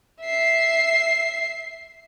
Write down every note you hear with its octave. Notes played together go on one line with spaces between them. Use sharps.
E5 C7